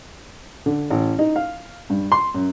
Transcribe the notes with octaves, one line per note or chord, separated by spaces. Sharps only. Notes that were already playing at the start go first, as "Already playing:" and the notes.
D3
A1
D#4
F5
G2
C6
F#2